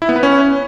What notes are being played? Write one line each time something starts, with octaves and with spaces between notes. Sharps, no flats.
E4
B3
B4
C#4